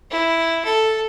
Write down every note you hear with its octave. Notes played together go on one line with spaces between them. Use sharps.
E4
A4